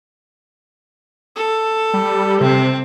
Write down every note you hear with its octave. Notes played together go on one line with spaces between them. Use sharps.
A4
G3
C3 C4